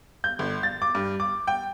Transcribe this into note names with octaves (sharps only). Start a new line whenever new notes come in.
G6
G1
A6
D6
G2
D6
G5